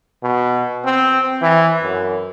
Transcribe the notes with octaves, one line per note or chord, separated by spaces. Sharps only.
B2
C4
E3
F#2